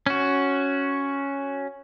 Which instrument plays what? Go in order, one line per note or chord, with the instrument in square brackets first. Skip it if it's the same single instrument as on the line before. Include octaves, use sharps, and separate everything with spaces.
[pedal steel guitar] C#4 F#4